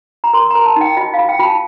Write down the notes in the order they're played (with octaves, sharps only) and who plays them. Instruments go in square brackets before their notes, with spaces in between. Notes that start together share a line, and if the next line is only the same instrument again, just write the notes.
[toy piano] A#5
A#4 C6
A#4 A#5
A5
D#4 G5
F4 D#5
F4 F5
G5
F4
A5